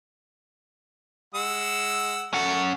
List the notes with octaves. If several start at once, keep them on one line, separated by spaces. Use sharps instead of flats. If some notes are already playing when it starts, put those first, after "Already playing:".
G#3 F#5 E6
A3 C#4 F#5